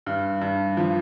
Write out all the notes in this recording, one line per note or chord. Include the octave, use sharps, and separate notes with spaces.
G2
G2
F3